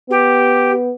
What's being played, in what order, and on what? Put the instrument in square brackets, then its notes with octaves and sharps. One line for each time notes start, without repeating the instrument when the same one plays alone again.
[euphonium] B3 [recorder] G4